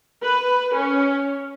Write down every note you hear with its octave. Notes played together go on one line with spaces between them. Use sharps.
B4
C#4